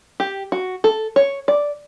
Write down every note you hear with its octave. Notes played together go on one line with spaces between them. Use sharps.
G4
F#4
A4
C#5
D5